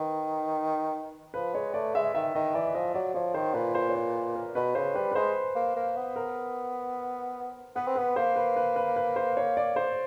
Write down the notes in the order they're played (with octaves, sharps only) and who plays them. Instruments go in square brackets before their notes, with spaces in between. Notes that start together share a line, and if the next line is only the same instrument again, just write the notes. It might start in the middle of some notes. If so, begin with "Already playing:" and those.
Already playing: [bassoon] D#3 [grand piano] B4
[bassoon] F3 [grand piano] B4
[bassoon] G#3 [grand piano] C#5
[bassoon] A3 [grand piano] D5
[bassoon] G#3 [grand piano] E5
[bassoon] D#3 [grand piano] E5
[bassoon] D#3 [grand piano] D#5
[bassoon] E3 [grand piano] D5
[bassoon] F3 [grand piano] D#5
[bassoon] F#3 [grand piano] D5
[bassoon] F3 [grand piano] C#5
[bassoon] D#3 [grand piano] C5
[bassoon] A#2 [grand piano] B4
[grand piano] C5
C#5
C5
A#4
[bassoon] B2 [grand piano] B4
[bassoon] C#3 [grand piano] C5
[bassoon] G3 [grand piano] B4
[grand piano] B4
[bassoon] G#3 [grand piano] C5
[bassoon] A#3
A#3
B3
[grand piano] A#4
[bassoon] B3 [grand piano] B4
[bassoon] C4
[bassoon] B3 [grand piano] B4
[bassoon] A#3 [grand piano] C5
[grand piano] B4
B4
B4
B4
C5
C#5
D5
C5